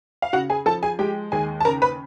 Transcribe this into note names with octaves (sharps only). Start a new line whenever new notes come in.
F5
C#3 F#4 F#5
G#4 G#5
F3 A4 A5
G#4 G#5
G#3 G4 G5
D#2 G#4 G#5
A5
C#3 A#4 A#5
B4 B5